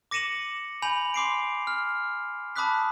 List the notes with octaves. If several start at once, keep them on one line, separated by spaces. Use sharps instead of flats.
D6 A#6 C#7 D#7 E7 F#7
G#5 B5 G6 F7 F#7
C6 D6 C7 D7
F6
A5 B5 D6 D#6 F#6 B6